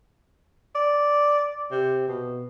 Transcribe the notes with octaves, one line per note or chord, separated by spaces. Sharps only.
D5
C3
B2